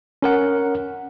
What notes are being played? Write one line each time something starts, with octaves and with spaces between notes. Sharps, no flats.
C#4 A#4 F#5